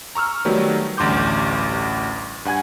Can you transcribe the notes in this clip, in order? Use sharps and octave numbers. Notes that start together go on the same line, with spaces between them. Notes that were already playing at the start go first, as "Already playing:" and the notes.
A#5 C#6 E6 F6
D#3 F#3 G3 A3 B3
A1 D2 G2 C6 D6 G6
G2 F#5 G#5 G#6